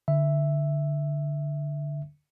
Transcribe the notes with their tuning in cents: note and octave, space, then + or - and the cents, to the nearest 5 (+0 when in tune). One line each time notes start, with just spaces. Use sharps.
D3 +0 E5 +0